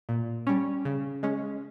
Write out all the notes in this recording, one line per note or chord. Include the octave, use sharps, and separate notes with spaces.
A#2
G3 C#4
C#3
G#3 C#4